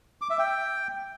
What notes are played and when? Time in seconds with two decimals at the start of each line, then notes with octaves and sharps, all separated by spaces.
0.21 D6
0.30 E5
0.39 G5